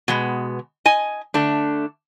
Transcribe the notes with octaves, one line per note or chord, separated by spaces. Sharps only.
B2 G#3 B3
D#5 G#5
D3 A3 D4